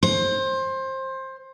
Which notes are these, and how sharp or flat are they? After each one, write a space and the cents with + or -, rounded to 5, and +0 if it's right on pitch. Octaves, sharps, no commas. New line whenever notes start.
C5 +20